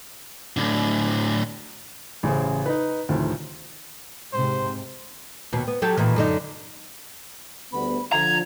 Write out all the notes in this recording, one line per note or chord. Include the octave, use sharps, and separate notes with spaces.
A2 D3
A1 C#3 G#4 C5
D#4 B4
D2 A2 C3 D#3 F3 C4
G#2 C3 C5
D#2 B2
B3
F#3 G4 A4
A#2 D#3 E3
F#2 D3 D#4
D2 G3 B3 B5
D3 F3 A#5 G#6